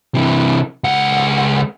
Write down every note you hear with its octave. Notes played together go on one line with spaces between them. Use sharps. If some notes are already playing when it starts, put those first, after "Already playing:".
C3 E3
C#2 F#5